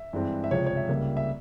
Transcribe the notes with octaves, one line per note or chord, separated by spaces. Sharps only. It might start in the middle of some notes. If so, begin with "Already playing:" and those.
Already playing: E5
G2 E3 G#3 C4
E5
C#2 C3 F3 G#3 C#5
C#5
E5
C#2 C#3 G3 A#3
E5